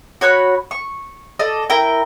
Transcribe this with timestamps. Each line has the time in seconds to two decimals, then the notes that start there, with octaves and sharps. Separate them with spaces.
0.21 F#4 C#5 B5 F#6
0.71 C#6
1.39 A4 D5 D#5
1.70 E4 A#4 G5